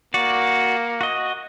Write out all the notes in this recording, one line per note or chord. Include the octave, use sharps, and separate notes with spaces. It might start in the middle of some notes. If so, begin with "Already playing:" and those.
A#3 F#4 D5
F#4 D#5